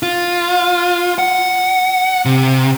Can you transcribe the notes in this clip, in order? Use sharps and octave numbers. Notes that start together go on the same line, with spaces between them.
F4
F#5
C3